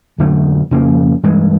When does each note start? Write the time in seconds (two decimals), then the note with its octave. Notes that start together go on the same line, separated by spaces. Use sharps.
0.18 F2 D3 F#3 A3
0.71 F2 C#3 F3 A#3
1.23 G2 E3 G#3